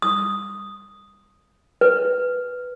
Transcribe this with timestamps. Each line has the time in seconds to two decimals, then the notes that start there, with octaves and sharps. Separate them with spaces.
0.02 D#6
1.81 B4